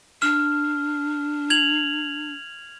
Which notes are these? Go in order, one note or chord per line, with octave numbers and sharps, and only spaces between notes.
D4 F6
G#6 F7 F#7